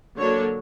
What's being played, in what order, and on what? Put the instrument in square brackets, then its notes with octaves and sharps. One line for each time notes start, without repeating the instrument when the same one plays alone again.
[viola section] D3 F#3 A#3 D4 C#5